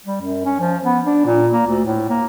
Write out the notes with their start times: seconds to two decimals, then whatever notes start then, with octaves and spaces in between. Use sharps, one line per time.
0.06 G3
0.22 F#2
0.46 C#4
0.60 F3
0.84 B3
1.05 D4
1.26 A#2
1.52 A#3
1.67 D2
1.85 A2
2.10 A#3